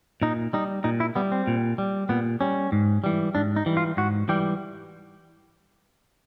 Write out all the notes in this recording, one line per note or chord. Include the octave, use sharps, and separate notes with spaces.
A#2 D#4
G3 D#4
A#2 D#4
E4
G3 B3
C4
A#2
G3
A#2 B3
G3 C#4
G#2
E3 G3
G#2 D4
D#4
E3 G3
F4
G#2 F#4
E3 G3 G4